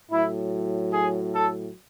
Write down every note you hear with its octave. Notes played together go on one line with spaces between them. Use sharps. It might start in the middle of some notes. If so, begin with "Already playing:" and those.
A2 F#3 E4
G#4
A4